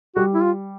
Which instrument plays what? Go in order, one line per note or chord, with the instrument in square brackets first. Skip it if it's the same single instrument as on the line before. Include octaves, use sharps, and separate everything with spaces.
[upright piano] G3 [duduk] F#4
[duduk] E4
F4